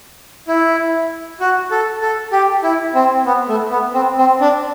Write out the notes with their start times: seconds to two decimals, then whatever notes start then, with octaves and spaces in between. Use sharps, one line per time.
0.48 E4
1.40 F#4
1.71 A4
2.02 A4
2.32 G4
2.63 E4
2.94 C4
3.26 B3
3.49 A3
3.71 B3
3.94 C4
4.18 C4
4.41 D4